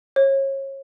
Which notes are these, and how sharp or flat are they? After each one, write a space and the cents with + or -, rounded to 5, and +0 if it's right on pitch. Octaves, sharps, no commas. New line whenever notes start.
C#5 -30